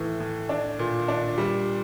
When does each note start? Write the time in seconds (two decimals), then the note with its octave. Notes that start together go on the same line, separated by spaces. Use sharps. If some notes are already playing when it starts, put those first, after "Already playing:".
Already playing: A2 E3
0.20 A2
0.49 D4
0.79 A#2
1.08 D4
1.38 G3